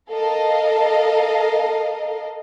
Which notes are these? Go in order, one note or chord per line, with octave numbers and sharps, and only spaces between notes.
A4 A#4 D#5 F5